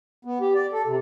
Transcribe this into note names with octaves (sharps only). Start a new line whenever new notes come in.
B3
G4
D5
A4
C3